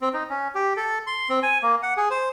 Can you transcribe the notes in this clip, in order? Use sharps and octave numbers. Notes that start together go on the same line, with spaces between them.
C4
D#4
C#4
G4
A4
C6
C4
G#5
A#3
F#5
G#4
C5